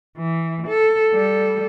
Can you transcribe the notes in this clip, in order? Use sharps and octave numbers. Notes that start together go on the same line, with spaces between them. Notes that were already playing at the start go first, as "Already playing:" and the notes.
E3
A4
G3 A4